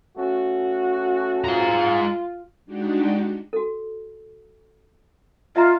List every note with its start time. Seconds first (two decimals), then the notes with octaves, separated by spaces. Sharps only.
0.16 A3 C#4 F#4
1.44 G#3 F4 A#5
2.66 G#3 D4 D#4 F#4 G4
3.53 F#4 A4
5.56 F4 D#5 E5 A#5